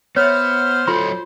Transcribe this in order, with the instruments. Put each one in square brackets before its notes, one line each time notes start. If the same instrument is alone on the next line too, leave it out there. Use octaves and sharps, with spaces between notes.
[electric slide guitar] B3 [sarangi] C5 [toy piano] C#5 E5 [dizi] F6
[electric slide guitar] F#3 A4 C#5 [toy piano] F4 C6